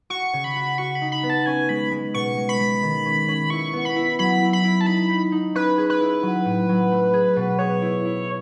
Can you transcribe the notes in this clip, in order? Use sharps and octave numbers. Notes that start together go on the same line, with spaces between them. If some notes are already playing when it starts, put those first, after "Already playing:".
F#4 C#6
C#3
B5
F#4
F#4 C#6
B5
D#4
B5
B3
A5
C#4 G#5
G#3 B5
G#3
B2 C#6
G#3
B5
G#3
D#3
C#4
C#4
E4 C#6
B3
B5
E4
F#3 B5
E4
B5
E4
A5
D#4 B5
D#4
D#4
C#4 B4
G#4
B4
E4
F#3
A2
F#3
A3
G#4
B2
G#4 C#5
E4
E4